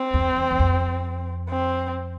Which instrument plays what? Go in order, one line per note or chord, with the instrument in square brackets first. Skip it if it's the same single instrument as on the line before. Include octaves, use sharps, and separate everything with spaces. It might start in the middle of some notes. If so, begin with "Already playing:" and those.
Already playing: [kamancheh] C4
[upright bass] E2
E2
E2
F2
[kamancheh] C4